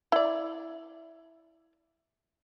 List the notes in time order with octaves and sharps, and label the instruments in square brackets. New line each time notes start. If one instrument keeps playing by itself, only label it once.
[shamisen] E4 D5